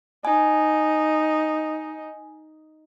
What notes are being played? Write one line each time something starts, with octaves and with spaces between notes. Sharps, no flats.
D#4 G#5